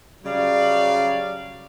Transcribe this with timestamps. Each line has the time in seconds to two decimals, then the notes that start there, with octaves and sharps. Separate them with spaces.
0.23 C#3 F#3 G3 D5 F5